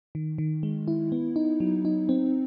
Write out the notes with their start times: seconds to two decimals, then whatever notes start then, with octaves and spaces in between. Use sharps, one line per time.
0.15 D#3
0.38 D#3
0.63 G#3
0.88 E4
1.12 B3
1.36 D#4
1.60 F#3
1.85 D#4
2.09 C4